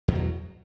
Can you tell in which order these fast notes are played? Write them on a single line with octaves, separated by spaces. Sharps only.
E2 B2 F#3